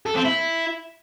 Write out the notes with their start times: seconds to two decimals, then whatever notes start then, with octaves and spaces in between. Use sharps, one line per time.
0.06 A4
0.15 C4
0.25 E4